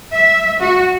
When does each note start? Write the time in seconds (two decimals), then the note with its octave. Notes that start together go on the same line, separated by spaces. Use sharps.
0.15 E5
0.61 F#4